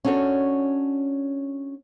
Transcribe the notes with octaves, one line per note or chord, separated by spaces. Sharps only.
C#4 D4 F#4 A4 C#5